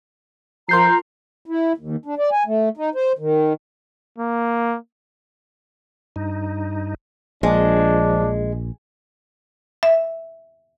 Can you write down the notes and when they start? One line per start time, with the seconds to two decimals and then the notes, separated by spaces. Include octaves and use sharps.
0.69 F3 F4 A#4 A#5 C6 G6 C7
1.46 E4
1.78 D#2
2.06 D4
2.18 D5
2.32 G#5
2.46 A3
2.77 D#4
2.95 C5
3.19 D#3
4.18 A#3
6.16 G2 D#4
7.43 A#1 F3 G#3 D4
9.83 E5